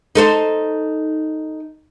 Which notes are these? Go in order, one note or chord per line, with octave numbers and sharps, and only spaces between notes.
D#4 A4 C5